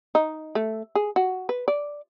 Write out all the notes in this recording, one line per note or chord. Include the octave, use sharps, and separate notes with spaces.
D#4
A3
G#4
F#4
B4
D5